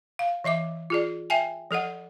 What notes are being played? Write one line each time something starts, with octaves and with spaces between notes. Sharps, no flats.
F5
E3 D#5 E5 D6
F4 G#4 D5
E5 G5 G#5
F3 A4 D#5 F#5